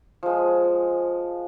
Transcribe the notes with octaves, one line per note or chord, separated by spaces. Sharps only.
F3 G#3